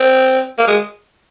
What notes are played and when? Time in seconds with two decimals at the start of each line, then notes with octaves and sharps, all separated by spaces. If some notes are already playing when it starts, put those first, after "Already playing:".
Already playing: C4
0.59 A#3
0.67 G#3